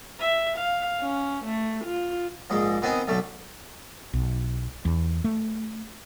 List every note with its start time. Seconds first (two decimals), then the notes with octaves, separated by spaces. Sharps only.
0.20 E5
0.57 F5
1.01 C#4
1.45 A3
1.85 F4
2.50 A#1 G#2 G#3
2.82 D#3 B3 C4 D#5 G#5 D#6
3.08 B1 D3 A3
4.13 B1
4.85 E2
5.24 A3